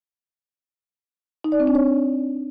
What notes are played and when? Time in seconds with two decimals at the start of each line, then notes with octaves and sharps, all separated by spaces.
1.44 D#4
1.52 D5
1.60 C4
1.67 D4
1.75 C#5